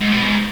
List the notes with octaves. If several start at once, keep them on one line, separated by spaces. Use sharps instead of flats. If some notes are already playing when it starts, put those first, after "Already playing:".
G#2
B2
G#2